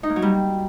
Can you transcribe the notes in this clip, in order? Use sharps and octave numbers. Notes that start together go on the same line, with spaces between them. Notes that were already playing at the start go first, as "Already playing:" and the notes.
D#4
A#3
F#3
G3